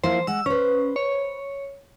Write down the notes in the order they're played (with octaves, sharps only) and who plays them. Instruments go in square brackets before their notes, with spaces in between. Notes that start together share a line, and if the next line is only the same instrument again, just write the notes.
[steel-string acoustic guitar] F3 A#3 E4 [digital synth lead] C5
[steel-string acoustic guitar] G#3 F#5 [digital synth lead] E6
[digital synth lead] C#4 [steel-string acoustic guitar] B4 C5
[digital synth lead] C#5